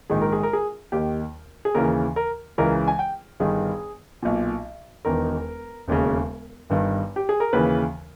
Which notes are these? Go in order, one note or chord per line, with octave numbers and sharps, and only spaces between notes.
A#1 G#2 D#3 G#4
A#4
G#4
A#4
G#4
D#2 D#3 G4
G#4
D#2 C#3 E3 A#4
A#4
C#2 C#3 E3 A#4
G#5
G5
G1 G2 D#3 G#4
B1 A#2
E1 E2 D#3 A#4
E1 D#2 C#3
G1 G2 D#3
G4
G#4
A#4
D#2 C#3 E3 B4